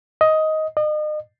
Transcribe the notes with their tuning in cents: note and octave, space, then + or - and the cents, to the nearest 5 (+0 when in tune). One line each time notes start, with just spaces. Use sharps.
D#5 +10
D#5 -40